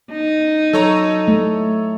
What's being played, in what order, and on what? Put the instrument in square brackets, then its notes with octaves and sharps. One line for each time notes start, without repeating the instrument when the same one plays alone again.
[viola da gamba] D#4
[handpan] F#3 [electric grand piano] A4 C#5 A#5
[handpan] A3